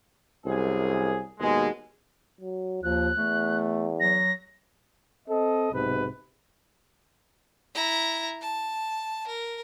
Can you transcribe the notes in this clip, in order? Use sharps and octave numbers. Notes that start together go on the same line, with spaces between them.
C2 F#2 G#4
D#2 B2 G#3
F#3
D#2 F3 F#6
E2 A3
F#3 A#6
C4 A4 D#5
B1 G#2 C3 B4
E4 A#5
A5
A#4